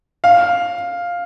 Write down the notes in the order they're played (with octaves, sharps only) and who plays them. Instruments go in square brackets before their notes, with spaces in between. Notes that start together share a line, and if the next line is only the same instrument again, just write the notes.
[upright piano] F5